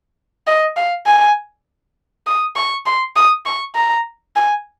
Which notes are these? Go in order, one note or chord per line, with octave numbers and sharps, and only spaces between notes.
D#5
F5
G#5
D#6
C#6
C6
D#6
C#6
A#5
G#5